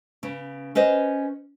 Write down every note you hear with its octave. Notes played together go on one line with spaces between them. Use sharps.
C#3 B3
C#4 B4 C5 D#5